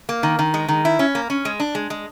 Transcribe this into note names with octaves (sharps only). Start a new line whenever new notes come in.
A#3
D#3
D#3
G#3
D#3
E4
C#4
A#3
C#4
G#3
D4
G#3
G#3